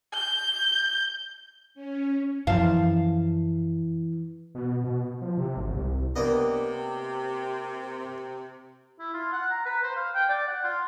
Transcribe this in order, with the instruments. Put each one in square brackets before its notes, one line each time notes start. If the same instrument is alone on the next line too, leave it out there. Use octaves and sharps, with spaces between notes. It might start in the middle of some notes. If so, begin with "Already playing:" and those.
[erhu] G6
[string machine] C#4
[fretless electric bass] F#2 F3 [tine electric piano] E3 [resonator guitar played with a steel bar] F5 A5
[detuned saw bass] B2
B2
F3
C3
G#1
C2
[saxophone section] C3 [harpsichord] A#3 D#5 [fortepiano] B3 D4 B4
[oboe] E4
F4
F#5
A#5
B4
C5
F5
G5
D5
F#5
F4